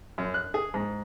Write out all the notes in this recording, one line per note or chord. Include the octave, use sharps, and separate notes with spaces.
F#2
F#6
G#4
G#2